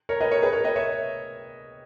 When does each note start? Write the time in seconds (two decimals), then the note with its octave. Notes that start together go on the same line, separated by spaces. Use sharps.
0.09 A#4 C#5
0.21 B4 D#5
0.31 A#4 C#5
0.42 G#4 B4
0.53 A#4 C#5
0.64 B4 D#5
0.76 C#5 E5